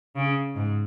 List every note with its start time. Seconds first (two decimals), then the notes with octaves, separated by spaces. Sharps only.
0.16 C#3
0.56 G#2